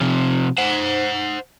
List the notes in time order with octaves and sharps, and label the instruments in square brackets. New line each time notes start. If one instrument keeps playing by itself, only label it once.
[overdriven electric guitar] C3 F3
C5 F#5